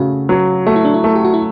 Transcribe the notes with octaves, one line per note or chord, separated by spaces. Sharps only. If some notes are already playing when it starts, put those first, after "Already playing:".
Already playing: C#3 A3 F#4
F#3
A3 F#4
E4
D4
E4
A3 A4
G4
F#4
E4